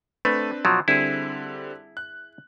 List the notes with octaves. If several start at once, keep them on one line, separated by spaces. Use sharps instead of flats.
A3 C4 D4 B4
B2 F3 F#3
D3 G3 C4 E4 G#4
F#6